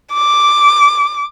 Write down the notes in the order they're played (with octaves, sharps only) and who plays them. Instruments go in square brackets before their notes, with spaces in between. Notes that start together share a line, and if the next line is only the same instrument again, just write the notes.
[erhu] D6